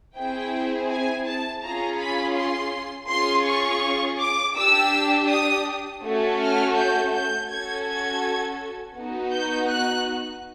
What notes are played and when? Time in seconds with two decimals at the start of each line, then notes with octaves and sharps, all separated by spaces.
0.15 C4 E4 G#4 G5
0.90 G#5
1.25 A5
1.62 C#4 F4 G#4 A#5
1.98 B5
2.35 C6
3.08 C#4 F4 G#4 C6
3.46 C#6
4.19 D6
4.55 D4 G4 E6
5.29 D#6
6.01 A3 C#4 F#4 A4
6.38 F6
6.75 G6
7.11 G6
7.48 C#4 F#4 A4 G#6
7.85 G#6
8.96 B3 D#4 F#4
9.31 G6
9.69 F#6